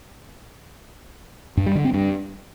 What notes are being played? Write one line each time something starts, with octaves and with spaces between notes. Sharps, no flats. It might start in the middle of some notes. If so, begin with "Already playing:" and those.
G2
G3
D3
C4
G2